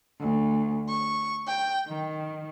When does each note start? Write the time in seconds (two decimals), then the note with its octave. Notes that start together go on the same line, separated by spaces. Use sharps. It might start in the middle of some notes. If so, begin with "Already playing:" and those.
0.20 D2
0.88 C#6
1.47 G5
1.87 D#3